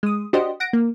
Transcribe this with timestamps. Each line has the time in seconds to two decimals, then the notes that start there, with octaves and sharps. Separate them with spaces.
0.03 G#3 D#6
0.33 D4 F#4 G4 C5 D#5
0.60 F#5 A#6 D7
0.73 A#3